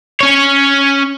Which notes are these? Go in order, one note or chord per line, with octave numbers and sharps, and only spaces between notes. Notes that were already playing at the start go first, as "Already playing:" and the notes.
C#4 C#5